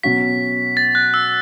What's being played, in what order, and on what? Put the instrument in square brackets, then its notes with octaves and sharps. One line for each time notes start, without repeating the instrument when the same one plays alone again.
[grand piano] B2 F#3 C#4 F#4 [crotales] B6
[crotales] A6
F#6
E6